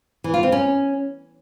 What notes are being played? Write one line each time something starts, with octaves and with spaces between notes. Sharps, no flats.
E3
F4
C4
C#4